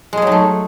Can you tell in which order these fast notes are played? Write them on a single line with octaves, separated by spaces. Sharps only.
G#3 G#4 F#3 D#4 A3